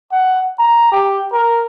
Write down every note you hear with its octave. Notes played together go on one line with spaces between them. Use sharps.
F#5
A#5
G4
A#4